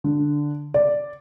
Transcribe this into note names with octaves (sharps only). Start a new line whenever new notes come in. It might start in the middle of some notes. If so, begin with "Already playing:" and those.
D3
D5